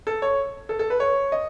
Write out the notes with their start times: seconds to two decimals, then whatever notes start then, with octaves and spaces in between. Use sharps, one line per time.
0.07 A4
0.22 C#5
0.69 A4
0.79 A4
0.90 B4
1.00 C#5
1.32 D#5